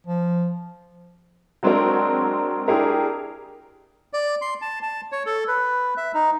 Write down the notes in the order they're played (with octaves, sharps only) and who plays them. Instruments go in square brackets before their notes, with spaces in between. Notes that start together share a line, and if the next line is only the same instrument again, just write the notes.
[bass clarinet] F3
[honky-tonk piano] F#3 G#3 C4 D4 F#4 A#4
D4 E4 G4 G#4 A#4
[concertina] D5
C6
A5
A5
C#5
A4
B4
E5
D#4